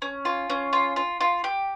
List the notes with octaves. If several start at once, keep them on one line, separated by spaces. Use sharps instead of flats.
C#4
F4
C#4
F4
F4
F4
G4